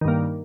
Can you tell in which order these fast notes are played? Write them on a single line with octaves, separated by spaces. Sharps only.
D#3 G2 A#3